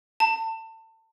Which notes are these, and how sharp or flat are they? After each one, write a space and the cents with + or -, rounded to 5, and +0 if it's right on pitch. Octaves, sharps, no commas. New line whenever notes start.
A5 +30